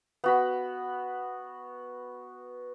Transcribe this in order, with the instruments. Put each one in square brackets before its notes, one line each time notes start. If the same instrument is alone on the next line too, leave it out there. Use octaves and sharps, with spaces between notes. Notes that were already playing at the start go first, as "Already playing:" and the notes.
[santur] B3 F#4 B5